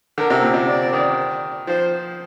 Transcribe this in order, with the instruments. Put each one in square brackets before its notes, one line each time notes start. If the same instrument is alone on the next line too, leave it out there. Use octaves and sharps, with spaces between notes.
[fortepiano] D3 [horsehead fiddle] A#4
[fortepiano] C3
A#2
C3
[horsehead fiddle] D5
[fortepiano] D#3
[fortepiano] F3 [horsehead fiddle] C5